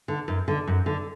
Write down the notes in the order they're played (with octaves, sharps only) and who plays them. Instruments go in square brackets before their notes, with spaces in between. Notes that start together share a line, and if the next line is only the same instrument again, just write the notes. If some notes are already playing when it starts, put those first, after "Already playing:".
[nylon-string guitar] D3
F#2
D3
F#2
D3